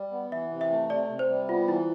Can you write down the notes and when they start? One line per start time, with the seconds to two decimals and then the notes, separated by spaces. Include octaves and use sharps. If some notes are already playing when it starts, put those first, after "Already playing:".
Already playing: G3
0.12 B3
0.31 E3 E5
0.51 C3
0.61 E5
0.70 A3
0.90 C3 D5
1.09 C3
1.19 C5
1.29 G3
1.48 B3 F4
1.68 E3 E4